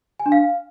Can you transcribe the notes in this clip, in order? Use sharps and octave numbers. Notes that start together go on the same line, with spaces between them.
G#5
D4
F5